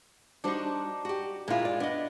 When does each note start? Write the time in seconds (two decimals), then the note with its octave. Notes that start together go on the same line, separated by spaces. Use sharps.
0.44 G3 D4 D#4 F#4 C5
1.05 F#4 G4
1.48 A#2 G#3 E4 F4
1.65 D5
1.80 B3 D4 D#5